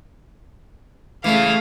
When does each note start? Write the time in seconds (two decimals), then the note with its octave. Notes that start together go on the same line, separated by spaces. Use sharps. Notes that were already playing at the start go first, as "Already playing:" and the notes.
1.24 C#3 E3 A3 F5